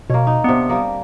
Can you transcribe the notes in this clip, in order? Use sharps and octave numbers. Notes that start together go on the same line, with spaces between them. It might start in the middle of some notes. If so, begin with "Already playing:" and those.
B2 A#3 C#5
D#4
C3 B3 D4
G3 A#3